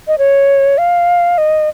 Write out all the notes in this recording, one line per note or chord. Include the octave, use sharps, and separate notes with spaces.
D#5
C#5
F5
D#5